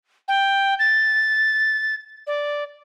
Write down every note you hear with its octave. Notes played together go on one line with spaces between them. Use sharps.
G5
A6
D5